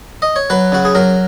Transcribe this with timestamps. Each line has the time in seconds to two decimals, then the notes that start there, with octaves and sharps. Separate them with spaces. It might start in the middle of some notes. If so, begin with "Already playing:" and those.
0.22 D#5
0.36 C#5
0.50 F#3 B4
0.72 C#3 F#4
0.85 G#4
0.95 F#3 A#4